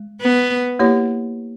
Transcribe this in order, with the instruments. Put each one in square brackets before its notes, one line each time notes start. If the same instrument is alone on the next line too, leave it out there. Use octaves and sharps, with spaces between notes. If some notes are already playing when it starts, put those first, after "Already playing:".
Already playing: [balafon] G#3
[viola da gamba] B3
[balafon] A#3 E4 G4 C#5